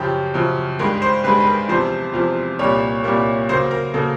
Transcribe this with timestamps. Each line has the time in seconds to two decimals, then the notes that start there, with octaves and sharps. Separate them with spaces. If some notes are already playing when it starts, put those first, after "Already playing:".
Already playing: F#2 C#3 F3 G4
0.34 F#2 C#3 F3
0.79 G2 D#3 G#3 A#4
1.02 C5
1.24 G2 D#3 G#3 B4
1.40 B4
1.47 A#4
1.69 E2 C3 F3 C5
2.14 E2 C3 F3
2.59 C2 A#2 G3 A#3 C#5
3.04 C2 A#2 G3 A#3
3.49 C#3 F#3 A#3 C5
3.71 A#4
3.94 C#3 F#3 A#3 A4